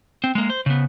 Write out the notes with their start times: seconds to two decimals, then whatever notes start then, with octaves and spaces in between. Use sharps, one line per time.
0.24 C4
0.35 G#3 A#3
0.50 C5
0.66 C#3 B3